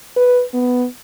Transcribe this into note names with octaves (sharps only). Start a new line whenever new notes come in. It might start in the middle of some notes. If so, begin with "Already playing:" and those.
B4
B3